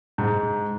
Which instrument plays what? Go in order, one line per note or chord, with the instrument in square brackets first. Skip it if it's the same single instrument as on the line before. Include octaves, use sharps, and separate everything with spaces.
[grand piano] G#2